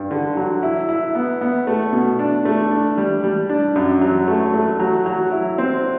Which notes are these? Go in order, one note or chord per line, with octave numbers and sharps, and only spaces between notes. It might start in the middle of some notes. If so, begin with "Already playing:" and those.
Already playing: G2
D3
F#3
E4
E4
B3
B3
A3
B2
D4
A3
D4
G3
G3
D4
F#2
F#3
A3
A3
F#3
F#3
E4
C4